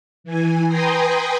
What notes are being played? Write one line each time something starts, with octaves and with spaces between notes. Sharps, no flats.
E3 G#5
B4 G5 G#5 A#5 C6 D#6